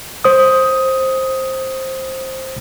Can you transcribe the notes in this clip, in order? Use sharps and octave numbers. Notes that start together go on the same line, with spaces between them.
C5 D#6